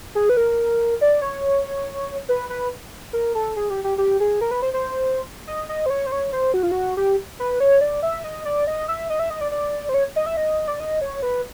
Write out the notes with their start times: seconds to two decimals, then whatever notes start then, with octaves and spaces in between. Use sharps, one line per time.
0.15 G#4
0.29 B4
0.37 A#4
1.01 D5
1.22 C#5
2.29 B4
2.49 B4
3.13 A#4
3.35 A4
3.56 G#4
3.70 G4
3.84 G4
3.98 G4
4.20 G#4
4.41 A#4
4.51 B4
4.62 C5
4.74 C5
5.47 D#5
5.69 D#5
5.86 C5
5.90 C#5
6.07 C5
6.12 C#5
6.32 C5
6.54 F#4
6.63 F4
6.71 F#4
6.97 G4
7.40 B4
7.60 C#5
7.81 D5
8.03 E5
8.24 D#5
8.45 D5
8.67 D#5
8.88 E5
9.10 D#5
9.19 E5
9.30 D#5
9.41 D5
9.52 D5
9.89 C5
9.94 C#5
10.16 D#5
10.26 E5
10.37 D#5
10.68 D5
10.80 D#5
11.01 C#5
11.22 B4